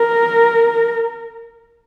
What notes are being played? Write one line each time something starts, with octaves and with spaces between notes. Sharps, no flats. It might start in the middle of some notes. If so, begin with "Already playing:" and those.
Already playing: A#4